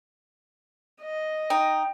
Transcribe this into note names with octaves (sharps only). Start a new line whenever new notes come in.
D#5
D#4 G5